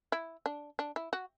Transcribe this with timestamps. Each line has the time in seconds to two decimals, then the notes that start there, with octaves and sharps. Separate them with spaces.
0.12 E4
0.46 D4
0.79 D4
0.96 E4
1.13 F#4